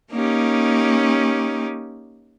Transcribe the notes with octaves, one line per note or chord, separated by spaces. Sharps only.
A#3 C#4 D#4 G4